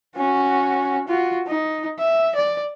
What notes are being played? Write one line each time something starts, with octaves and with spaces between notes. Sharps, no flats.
C#4 F#4
F4 F#4
D#4
E5
D5